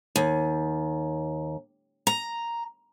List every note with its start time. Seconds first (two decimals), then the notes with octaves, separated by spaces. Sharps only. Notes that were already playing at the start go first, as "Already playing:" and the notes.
0.16 D#2
2.07 A#5